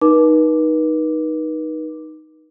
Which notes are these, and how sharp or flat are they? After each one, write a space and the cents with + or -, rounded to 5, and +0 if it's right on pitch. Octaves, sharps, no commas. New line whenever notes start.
D#4 +0 B4 -40 D6 +0